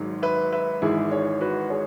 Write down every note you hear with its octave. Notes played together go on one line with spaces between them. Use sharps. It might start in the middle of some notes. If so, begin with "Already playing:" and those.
Already playing: G#1 G#2 F#3
B4 E5
B4 E5
G#1 G#2 E3 E4 G#4
G#4 C#5
F#4 B4
G#4 C#5